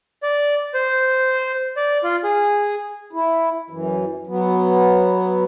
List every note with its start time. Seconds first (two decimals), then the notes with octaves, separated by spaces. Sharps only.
0.23 D5
0.74 C5
1.77 D5
2.03 F4
2.24 G#4
3.13 E4
3.70 F#2 E3
4.27 F#3 B3